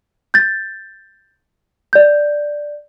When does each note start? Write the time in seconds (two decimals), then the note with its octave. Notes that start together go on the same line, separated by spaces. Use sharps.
0.34 G6 A6
1.93 D5 G6